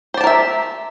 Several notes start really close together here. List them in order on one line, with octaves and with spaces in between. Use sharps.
C5 D5 A5 A#4 E5